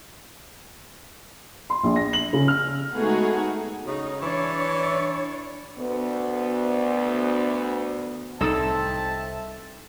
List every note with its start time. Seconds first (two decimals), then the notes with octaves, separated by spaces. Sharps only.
1.70 C6
1.83 A#1
1.96 A#6
2.13 F#7
2.33 C#3
2.48 F6
2.94 G#3 A3 B3 D#4 F#4 G#4
3.86 C#3 D#4
4.22 E3 D4 C#5 D5
5.78 D2 B3
8.41 C2 A2 C4 D#4 A4 E5 A5 E6